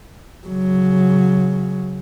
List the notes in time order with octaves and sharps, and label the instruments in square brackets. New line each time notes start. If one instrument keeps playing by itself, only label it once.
[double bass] C#3 F#3